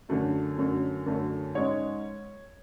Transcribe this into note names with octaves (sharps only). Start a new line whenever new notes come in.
F#2 D3 A3 C#4
F#2 D3 A3 C#4
F#2 D3 A3 C#4
G#2 G#3 C#4 C#5